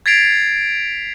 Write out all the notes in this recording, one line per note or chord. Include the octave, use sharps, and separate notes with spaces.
G#6 A6 B6 C7 D7 F7